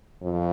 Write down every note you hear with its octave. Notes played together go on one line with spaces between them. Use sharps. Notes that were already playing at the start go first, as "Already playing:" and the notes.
F2